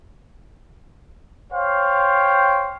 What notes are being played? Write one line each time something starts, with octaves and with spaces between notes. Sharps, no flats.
C5 C#5 F5 G5